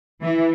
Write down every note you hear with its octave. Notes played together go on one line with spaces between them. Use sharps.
E3